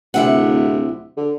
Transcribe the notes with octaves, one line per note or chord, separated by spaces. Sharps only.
D1 C3 E4 F#5
D3